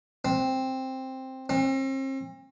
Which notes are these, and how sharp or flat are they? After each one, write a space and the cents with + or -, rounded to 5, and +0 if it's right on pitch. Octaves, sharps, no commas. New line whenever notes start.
C4 +5
C4 +40